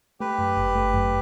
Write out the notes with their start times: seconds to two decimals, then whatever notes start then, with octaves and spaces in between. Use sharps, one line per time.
0.20 A3 G4 B4
0.38 F#2
0.57 G1
0.75 A3
0.94 F#2